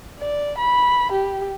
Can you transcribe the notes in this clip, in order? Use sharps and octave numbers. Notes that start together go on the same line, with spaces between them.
D5
B5
G4